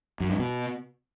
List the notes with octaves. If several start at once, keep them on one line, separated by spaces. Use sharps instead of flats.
F#2
G2
B2